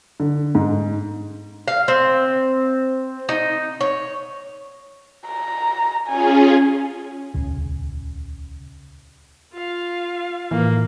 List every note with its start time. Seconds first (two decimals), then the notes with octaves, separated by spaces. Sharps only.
0.20 D3
0.55 G#2
1.68 F5
1.88 C4
3.29 D#4
3.81 C#5
5.28 A#5
6.07 C#4 F4 G#4 G#5
7.34 D#1 C#2 C#3
9.53 F4 F5
10.51 A2 E3 A#3